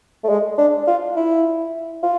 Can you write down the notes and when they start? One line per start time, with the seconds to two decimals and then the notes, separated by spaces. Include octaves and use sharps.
0.24 A3
0.29 G#3
0.58 D4
0.87 F4
1.16 E4
2.03 F4